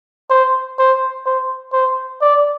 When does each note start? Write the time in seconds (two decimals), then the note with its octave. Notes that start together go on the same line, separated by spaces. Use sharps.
0.30 C5
0.78 C5
1.26 C5
1.73 C5
2.21 D5